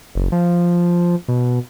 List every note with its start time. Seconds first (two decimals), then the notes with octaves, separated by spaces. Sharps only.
0.15 F#1
0.32 F3
1.28 B2